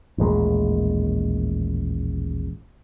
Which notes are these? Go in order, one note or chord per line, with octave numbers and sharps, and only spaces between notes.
A1 D#2 A#2 G#3